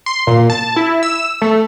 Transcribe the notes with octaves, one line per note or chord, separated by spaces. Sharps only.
C6
A#2
A5
E4
E6
A3